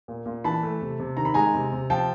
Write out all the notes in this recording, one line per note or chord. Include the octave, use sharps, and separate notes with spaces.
A#2
A#2
E3 A5 B5
A3
C3
C3
D#3 A#5
B5
G#3 G#5 A#5
C3
C3
F3 G5 A5